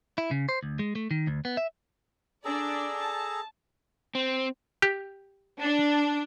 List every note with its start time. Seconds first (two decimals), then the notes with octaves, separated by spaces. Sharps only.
0.18 E4
0.31 C#3
0.49 C5
0.63 D2
0.79 G#3
0.95 A3
1.11 D#3
1.27 D2
1.45 B3
1.57 E5
2.45 D4 G#4 A4 D5 A#5
2.99 A5
4.15 C4
4.82 G4
5.60 D4